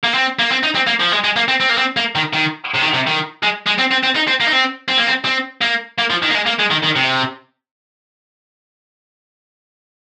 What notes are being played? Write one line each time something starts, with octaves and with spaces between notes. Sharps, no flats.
A#3
C4
A#3
C4
D#4
C4
A#3
F3
G#3
G#3
A#3
C4
C4
A#3
C4
A#3
D#3
D#3
C3
D#3
C3
D#3
G#3
G#3
C4
C4
C4
D#4
C4
A#3
D#4
C4
C4
A#3
C4
C4
A#3
A#3
F3
D#3
A#3
G#3
A#3
G#3
D#3
D#3
C3